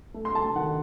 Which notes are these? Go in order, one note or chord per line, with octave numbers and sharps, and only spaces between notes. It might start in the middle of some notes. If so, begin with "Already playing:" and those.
A3
C6
A3 A5
D#3 F#5